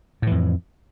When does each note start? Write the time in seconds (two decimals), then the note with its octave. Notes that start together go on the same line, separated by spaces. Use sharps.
0.22 A2
0.27 E3
0.31 F2